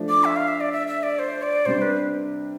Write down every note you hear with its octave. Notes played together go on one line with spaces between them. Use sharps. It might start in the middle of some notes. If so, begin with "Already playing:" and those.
Already playing: F3 A3 D4
D6
E5
F5
E5
D5
E5
E5
D5
C5
D5
C3 G3 D4 C5
B4